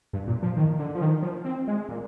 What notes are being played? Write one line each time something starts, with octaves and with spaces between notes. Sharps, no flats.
G2
A#2
F3
D#3
D3
F3
D#3
F3
C4
G#3
A#2